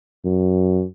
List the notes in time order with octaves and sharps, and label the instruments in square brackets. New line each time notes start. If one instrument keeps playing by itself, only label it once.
[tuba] F#2